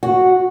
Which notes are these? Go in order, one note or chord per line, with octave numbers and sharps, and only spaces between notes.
F#4